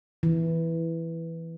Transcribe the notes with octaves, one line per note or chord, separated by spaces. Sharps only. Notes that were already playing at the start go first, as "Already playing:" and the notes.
E3